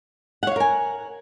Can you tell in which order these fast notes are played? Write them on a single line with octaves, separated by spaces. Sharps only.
F#5 C#5 F5 A#4 G#5